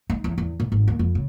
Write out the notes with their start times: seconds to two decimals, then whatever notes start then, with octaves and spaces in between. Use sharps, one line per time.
0.10 D#4
0.24 E2
0.38 E2
0.60 B1
0.72 G#1
0.88 D#2
0.99 F2
1.15 C#3